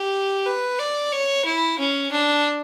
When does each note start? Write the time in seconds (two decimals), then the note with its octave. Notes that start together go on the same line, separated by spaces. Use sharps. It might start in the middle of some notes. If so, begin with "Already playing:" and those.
Already playing: G4
0.46 B4
0.79 D5
1.12 C#5
1.45 E4
1.79 C#4
2.11 D4